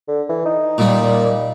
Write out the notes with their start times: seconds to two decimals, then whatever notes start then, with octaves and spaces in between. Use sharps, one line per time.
0.08 D3
0.29 E3
0.45 D#4
0.78 A#2 G3